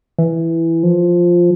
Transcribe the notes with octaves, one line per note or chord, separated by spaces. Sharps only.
E3
F3